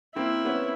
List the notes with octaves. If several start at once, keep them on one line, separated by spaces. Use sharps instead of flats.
A#3 C4 E4
B3 C#4